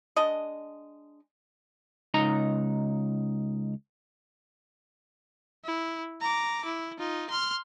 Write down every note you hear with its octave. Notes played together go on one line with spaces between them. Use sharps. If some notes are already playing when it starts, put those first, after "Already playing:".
G#3 D4 D#5
C#2 D#4 A#5
E4
A#5 D6
E4
D#4 F4
C6 F6